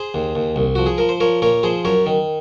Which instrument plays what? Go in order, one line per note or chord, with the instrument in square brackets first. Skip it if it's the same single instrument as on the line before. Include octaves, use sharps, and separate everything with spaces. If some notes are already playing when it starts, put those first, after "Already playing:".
Already playing: [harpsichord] G#4 C5
D#2
D#2
C2
F3 F#4
G#4
F3 A#4
C5
F3 A#4 C#5
A#2 A#4 C#5
F3 G#4 C5
F#2 A#4 C#5
D#3